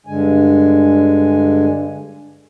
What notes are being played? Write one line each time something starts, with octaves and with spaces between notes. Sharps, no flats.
G2 D3 G#3 G#5